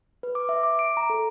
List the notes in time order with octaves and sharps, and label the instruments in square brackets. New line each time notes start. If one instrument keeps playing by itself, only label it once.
[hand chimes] B4
D6
E5
D6
D7
A#5
A4